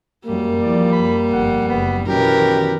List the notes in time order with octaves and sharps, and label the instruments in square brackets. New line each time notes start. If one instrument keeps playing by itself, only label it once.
[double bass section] F#2 G#3 [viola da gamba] G3 [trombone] A#3
[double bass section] E2 F3 [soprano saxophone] D5
[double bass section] F#2 [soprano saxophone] B5
[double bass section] G1 F2 [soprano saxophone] F#5
[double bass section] F#1 [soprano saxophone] B3
[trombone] F#2 [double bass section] B2 D#3 E3 [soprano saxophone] G4 [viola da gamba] A#4 B4